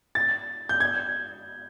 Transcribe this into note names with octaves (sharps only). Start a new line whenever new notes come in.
A6
G6
G#6